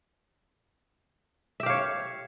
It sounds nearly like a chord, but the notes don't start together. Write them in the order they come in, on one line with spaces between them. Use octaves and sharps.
E5 G4 F5 C#5